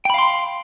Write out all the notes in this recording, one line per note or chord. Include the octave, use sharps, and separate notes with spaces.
F5 G5 B5 C6